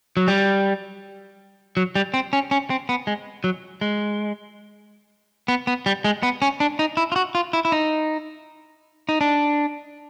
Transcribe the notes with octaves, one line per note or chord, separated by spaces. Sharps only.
F#3
G3
F#3
G3
C4
C#4
C#4
C4
B3
G#3
F#3
G#3
B3
B3
G3
G#3
B3
C#4
D4
D#4
E4
F4
F#4
F4
E4
E4
D#4
D#4
D4